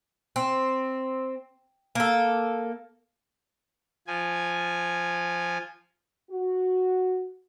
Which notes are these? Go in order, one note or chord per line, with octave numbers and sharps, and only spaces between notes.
C4
A#3 A4
F3 G#5
F#4